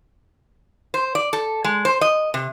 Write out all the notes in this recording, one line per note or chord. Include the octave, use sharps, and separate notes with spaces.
C5
D5
A4
G#3
C5
D#5
C3